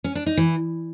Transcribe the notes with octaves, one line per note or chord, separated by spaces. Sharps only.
C#4
D4
D#4
E3